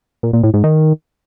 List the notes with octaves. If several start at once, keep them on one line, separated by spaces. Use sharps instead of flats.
A#2
A#2
A2
G#2
D#3